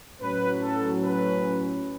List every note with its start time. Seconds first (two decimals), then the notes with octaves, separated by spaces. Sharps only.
0.21 A2 F#3 C#4 B4
0.62 A4
1.04 B4